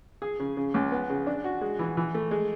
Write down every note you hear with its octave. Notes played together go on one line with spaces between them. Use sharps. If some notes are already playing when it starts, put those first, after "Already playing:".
G#4
C#3
C#3
C#2
B3
C#3
D4
F#4
G#3
E3
E3
A3
G#3